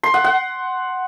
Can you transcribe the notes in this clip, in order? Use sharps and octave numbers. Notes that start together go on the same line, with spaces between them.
C6
F#5
F#5